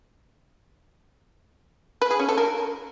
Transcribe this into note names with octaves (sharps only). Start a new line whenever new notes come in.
B4
G#4
C#4
A4
A#4